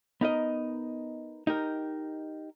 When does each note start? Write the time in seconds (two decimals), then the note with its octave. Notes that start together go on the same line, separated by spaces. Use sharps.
0.21 B3 D#4 A#4 D#5
1.47 D#4 G4 A#4